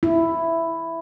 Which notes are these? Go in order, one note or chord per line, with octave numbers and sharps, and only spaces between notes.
E4